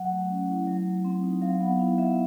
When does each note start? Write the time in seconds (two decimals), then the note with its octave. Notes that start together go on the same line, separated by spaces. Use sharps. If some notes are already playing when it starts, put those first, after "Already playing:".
Already playing: F#3 F#5
0.12 A3
0.29 C#4
0.49 E4
0.67 F#3
0.86 A3
1.05 C4
1.23 D#4
1.41 F#3 F5
1.60 B3 F#5
1.79 E4 F5
1.97 F#3 E5